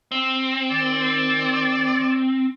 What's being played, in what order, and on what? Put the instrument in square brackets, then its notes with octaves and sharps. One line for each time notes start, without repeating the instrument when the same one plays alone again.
[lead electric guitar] C4
[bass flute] D#3 [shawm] D5